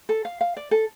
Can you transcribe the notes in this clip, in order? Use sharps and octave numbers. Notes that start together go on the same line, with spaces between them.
A4
F5
F5
D5
A4